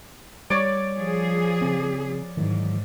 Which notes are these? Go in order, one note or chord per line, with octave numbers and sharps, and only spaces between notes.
G3 C#5 D5
F3 G#4
C#3 C4
G#2 D#3 E3 F#3